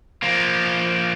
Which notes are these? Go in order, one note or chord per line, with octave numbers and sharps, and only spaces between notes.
F3 A#3